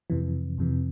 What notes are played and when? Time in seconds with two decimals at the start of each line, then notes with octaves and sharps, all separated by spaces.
0.10 F2 C3 E3
0.58 F2 C3 E3